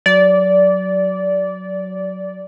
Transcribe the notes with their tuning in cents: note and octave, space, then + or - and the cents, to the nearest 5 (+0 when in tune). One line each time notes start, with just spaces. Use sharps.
F#3 +0 D5 -20